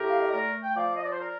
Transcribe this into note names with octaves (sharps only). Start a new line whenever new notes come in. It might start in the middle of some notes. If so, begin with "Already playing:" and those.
Already playing: A2 G4 A#4
F5
D#5
A3 A#4 D5
G5
F3 D5 F5
D#5
D5
C5
A#4 D5